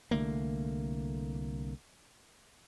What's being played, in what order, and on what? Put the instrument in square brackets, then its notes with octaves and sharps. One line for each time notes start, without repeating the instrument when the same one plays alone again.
[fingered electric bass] C2 D3 A3 A#3